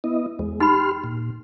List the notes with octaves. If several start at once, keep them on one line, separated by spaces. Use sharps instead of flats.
B3 E4 D#5
E2 G#3
D#4 G4 B5 C6 F6
A#2